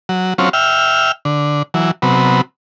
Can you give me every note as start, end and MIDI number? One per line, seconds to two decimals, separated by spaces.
0.09 0.34 54
0.38 0.49 54
0.38 0.49 60
0.38 0.49 61
0.38 0.49 65
0.53 1.12 76
0.53 1.12 79
0.53 1.12 89
1.25 1.63 50
1.74 1.91 52
1.74 1.91 54
2.02 2.41 48
2.02 2.41 54
2.02 2.41 59